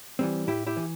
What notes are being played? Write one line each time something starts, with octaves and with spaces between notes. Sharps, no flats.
E3 G3 C4
A2 E4 G4
E4 G4
E3